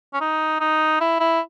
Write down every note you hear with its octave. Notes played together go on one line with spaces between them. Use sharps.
C#4
D#4
D#4
E4
E4